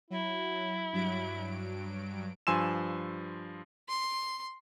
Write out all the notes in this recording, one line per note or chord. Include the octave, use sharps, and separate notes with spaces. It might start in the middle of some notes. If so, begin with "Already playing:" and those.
F#3 E4
G2 F#3 D7
G2 F3 G#5 C6 E6 E7
C6